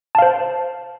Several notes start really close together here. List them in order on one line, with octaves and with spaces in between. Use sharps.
A5 F5 C5